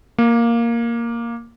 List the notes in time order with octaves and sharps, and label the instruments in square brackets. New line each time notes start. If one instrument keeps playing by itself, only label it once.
[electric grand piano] A#3